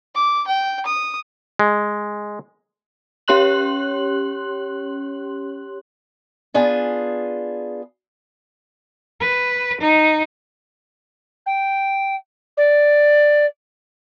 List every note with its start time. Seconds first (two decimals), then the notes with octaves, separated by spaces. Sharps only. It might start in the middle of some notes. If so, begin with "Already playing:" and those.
0.15 D6
0.47 G5
0.86 D#6
1.59 G#3
3.28 C#4 G4 C#5 C6 F#6 F#7
6.54 B3 D4 F4 G#4
9.21 B4
9.81 D#4
11.46 G5
12.57 D5